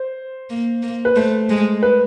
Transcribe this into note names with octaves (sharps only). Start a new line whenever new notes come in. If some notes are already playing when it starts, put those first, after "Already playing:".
Already playing: C5
A#3
A#3
B4
A3 C5
G#3
B4